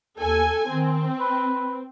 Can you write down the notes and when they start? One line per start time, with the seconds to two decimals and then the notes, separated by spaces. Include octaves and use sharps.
0.19 D#2 A4 G#5
0.69 D#3 C4
1.19 B4